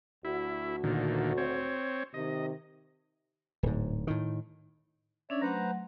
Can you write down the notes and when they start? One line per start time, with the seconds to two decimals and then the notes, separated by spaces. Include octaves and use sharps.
0.25 D2 E4 F#4
0.84 A#2 D3 D#3
1.38 C4 C#5
2.14 C3 D#3 D#5
3.63 D1 G#2
4.07 A2 D#3
5.30 C#4 D4 C#5 D5 E5
5.42 F#3 A3 B4 C5 F#5 A#5